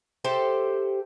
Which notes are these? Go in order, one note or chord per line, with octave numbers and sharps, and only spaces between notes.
G4 A4 C5 E5